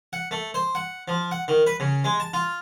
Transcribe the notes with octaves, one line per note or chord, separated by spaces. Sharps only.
F#5
A3
C5
F#5
F3
F#5
D#3
B4
C#3
G#3
A5
F4